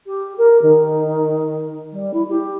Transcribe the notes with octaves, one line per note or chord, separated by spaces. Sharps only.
G4
A#4
D#3
G3
E4
G4